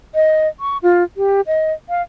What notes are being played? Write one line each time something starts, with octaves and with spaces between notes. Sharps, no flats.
D#5
C#6
F4
G4
D#5
F5